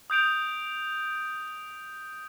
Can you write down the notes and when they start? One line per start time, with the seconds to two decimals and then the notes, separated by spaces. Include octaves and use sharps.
0.10 D#6 G6 D7 F7